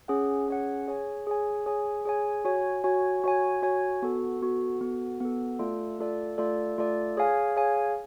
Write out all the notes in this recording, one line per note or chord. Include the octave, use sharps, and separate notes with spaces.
C#4 G#4 C#5 F#5
C#4 G#4 C#5 F#5
G#4 C#5 G#5
G#4 C#5 G#5
G#4 C#5 G#5
G#4 C#5 G#5
F#4 C#5 G#5
F#4 C#5 G#5
F#4 C#5 G#5
F#4 C#5 G#5
B3 F#4 A4
B3 F#4 A4
B3 F#4 A4
B3 F#4 A4
A3 F4 A4 D5
A3 F4 A4 D5
A3 F4 A4 D5
A3 F4 A4 D5
G#4 C#5 F5 G#5
G#4 C#5 F5 G#5